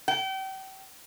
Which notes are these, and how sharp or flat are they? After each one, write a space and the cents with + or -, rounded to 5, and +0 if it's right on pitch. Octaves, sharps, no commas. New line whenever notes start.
G5 -35